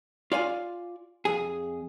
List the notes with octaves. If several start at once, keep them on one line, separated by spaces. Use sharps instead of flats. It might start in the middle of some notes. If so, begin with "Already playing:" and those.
F4 D5 F5 G#5
F2 G#4